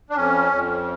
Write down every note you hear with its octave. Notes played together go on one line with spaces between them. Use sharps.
D4
F2 C#4
F2